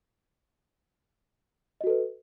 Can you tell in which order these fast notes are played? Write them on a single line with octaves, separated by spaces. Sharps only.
D#5 F#4 A4 B4